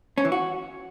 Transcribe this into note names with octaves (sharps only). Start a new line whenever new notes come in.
C#4
E3
F#4